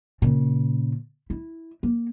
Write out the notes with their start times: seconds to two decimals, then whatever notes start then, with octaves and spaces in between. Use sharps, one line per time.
0.22 A#2 C#3
1.30 E4
1.83 A#3